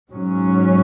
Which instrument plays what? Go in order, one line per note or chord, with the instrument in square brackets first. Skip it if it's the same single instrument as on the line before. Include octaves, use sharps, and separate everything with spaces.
[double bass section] G#2 F#3 C#4